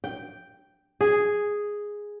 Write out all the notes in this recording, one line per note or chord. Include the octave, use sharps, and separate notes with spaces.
G5
G#4